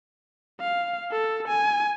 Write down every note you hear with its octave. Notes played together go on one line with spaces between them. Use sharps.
F5
A4
G#5